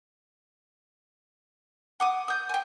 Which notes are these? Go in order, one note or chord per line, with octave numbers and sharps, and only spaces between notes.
F#5 D6 D#6
D#6 G6
G5 G#5